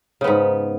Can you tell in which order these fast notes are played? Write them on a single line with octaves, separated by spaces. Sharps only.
C#3 B3 G#2